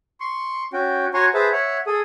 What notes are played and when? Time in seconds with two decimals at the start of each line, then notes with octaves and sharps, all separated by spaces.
0.20 C6 C#6
0.73 C#4 F#4 G5
1.14 F#4 C#5 G#5 A#5 C6 C#6
1.34 G#4 B4 C5 E5 A5
1.52 C#5 E5 F#5
1.87 G#4 A4 D#6